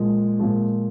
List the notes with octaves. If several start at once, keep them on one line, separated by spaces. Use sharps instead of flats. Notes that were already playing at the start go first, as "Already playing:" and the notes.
Already playing: A#2 F3 G#3
A#2 F3 G#3